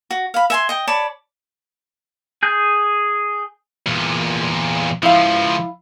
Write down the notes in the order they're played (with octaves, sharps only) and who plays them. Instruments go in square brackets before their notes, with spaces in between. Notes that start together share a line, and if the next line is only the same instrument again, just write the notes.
[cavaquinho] F#4
F5 B5
E5 G#5 C6
D#5 G5
C#5 D5 A5 B5
[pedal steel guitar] G#4 G6
[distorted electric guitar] E2 A#2
[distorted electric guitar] C#2 F3 [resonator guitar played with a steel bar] E4 F5